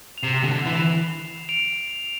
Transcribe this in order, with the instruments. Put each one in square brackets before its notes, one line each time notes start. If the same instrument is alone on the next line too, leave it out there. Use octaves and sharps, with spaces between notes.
[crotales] F7
[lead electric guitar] C3 [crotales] C7 E7
[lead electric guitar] D3
E3
[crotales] D7 F7